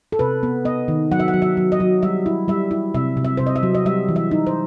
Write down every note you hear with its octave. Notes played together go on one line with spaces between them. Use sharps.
A4
C3 B4
B3
B3 D#5
D#3
F#3 F#5
E5
F#5
F#3
E5
F#3
D#5
F#3
G3 E5
E4
G3 E5
E4
C3 E5
C3
E5
C3 C5
D#5
E5
F#3
D#5
G3 E5
E3
E5
D#4
C5